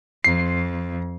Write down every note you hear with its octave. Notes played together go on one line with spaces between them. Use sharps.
F2 C7